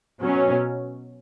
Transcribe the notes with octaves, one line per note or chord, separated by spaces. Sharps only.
B2 F#3 C#4